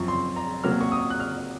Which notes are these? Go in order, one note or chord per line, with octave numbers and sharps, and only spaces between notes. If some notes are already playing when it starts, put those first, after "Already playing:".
Already playing: F#2 F3 C4 C#6
C6
A#5
C3 F#3 A#3 F6
C#6
D#6
F#6
F6